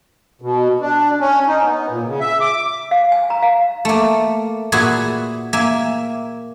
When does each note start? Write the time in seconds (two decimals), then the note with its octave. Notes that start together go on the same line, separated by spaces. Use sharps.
0.42 B2
0.81 D4
1.20 C#4
1.48 D#4
1.63 B3
1.90 A#2
2.07 C#3
2.20 E5
2.41 D6
2.91 F5
3.12 G#5
3.30 A#5
3.43 F5
3.85 A3 A#3
4.72 A#2 F#4 G#4 B4 E5 G#5
5.53 A#3 E5 G#5